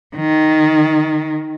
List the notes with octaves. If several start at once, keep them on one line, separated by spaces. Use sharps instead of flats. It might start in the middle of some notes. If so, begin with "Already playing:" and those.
D#3